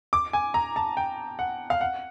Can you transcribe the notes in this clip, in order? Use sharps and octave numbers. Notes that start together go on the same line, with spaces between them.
D6
G#5
A#5
A5
G5
F#5
F5
F#5